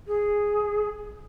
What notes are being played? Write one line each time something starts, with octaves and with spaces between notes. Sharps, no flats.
G#4